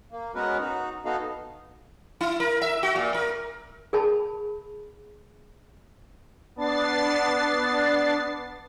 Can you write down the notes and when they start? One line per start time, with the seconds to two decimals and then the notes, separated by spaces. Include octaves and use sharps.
0.12 A#3
0.35 G#3 B3 C#4 F#4 A#4 B4
0.60 D#4 F#4
1.05 B3 D#4 F#4 A4 D#5 F5
2.21 E4
2.40 A#4
2.62 E5
2.83 F#4
2.96 A#2
3.14 A#4
3.93 G#4 A#4 A5 B5
6.56 B3 D4 A6 C7